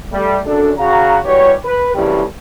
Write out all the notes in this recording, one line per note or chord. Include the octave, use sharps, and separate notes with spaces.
G3 A3
F#2 D4 A4
C#3 F#4 F5 A#5
E3 G3 F#4 G4 C#5
B4
C2 F#2 A2 C#3 E3 G3